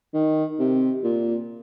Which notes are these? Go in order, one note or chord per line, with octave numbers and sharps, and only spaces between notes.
D#3
C3
A#2